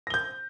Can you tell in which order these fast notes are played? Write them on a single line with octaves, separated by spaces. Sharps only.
A#6 G7 G6